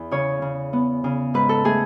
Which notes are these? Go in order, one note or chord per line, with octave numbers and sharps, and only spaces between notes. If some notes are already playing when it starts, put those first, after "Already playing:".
Already playing: E2
C#3 C#5
C#3
B3
C#3
G#2 B4
A4
A3 G#4